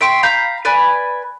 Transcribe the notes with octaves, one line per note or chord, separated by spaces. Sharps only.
E5 G5 C6 C#6
F5 A#5 B5 G6
B4 D5 G#5 B5